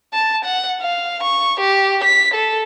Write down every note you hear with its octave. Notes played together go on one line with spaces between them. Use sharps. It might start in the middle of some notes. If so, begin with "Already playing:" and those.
A5
F#5
F5
C#6
G4
B6
A4